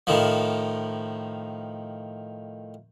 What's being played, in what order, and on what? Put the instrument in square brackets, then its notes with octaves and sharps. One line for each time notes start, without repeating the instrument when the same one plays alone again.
[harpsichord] A2 D#3 F3